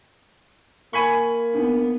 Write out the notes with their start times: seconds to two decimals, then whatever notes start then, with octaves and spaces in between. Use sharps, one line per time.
0.93 A#3 G#5 B5 C#6
1.55 B3 D4 D#4